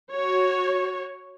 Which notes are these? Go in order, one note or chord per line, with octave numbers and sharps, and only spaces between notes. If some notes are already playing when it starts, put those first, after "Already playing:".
F#4 C#5